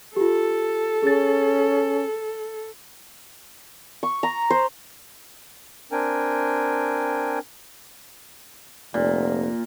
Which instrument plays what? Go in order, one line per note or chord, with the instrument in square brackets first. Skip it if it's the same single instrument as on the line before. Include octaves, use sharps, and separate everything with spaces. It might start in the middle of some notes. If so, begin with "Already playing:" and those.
[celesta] F4 G4 [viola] A4
[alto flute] C#4 [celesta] G#4 A6
[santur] C#6
A#5
C5
[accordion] C4 D4 A#4 G5 G#5
[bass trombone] F1 [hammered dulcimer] A#2